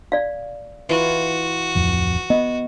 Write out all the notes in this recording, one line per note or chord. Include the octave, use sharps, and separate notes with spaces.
D5 F5
E3 F4 F#4
D1 F2
B3 D#5